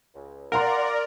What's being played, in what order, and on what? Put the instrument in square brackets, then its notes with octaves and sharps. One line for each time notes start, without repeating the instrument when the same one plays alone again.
[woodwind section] C#2
[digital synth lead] A#4 [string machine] D5 [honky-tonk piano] F5 A#5 C6 [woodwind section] F#5